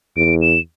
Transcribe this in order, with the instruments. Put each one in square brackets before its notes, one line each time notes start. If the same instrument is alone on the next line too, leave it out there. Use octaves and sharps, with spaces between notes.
[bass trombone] E2 [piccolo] D7
[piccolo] E7